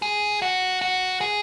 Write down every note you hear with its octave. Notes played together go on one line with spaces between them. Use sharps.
G#4
F#4
F#4
G#4